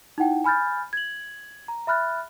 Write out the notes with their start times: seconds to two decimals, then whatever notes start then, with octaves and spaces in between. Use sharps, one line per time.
0.18 D#4 E4 F#5 G5
0.44 G#5 B5 F6 G6 A6
0.93 G#6 F#7
1.68 A#5
1.87 E5 B5 F6 F#6 A6